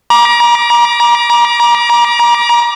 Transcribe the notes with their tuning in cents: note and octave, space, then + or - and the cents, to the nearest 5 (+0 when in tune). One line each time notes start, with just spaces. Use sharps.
A#5 +35 D6 +0